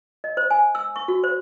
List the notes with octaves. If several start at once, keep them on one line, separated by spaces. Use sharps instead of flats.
D#5
C5
G#5
E6
C#6
F#4
C5